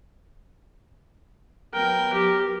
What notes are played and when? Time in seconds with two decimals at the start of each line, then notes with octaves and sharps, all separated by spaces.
1.74 F#3 B3 A#4 G5
2.14 F#3 G4